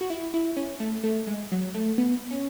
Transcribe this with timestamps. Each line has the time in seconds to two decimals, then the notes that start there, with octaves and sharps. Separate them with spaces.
0.01 F#4
0.10 E4
0.34 E4
0.57 C#4
0.80 A3
1.04 A3
1.27 G#3
1.52 F#3
1.74 A3
1.98 B3
2.31 C#4